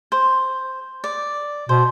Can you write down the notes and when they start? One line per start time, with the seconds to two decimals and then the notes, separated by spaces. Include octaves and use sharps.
0.12 C5
1.04 D5
1.69 B2 C5